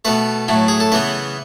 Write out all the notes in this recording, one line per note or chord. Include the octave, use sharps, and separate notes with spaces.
B2 A3 B4
A2 F#3 A3
G#4
A4
C#3 E3 B3 B4